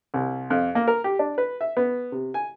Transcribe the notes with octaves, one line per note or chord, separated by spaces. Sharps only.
C2
F2
A#3
A#4
G4
D4
B4
E5
B3
C3
G#5